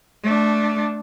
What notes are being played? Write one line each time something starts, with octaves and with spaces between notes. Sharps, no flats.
A3 D4